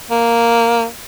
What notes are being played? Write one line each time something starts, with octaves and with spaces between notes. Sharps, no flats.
A#3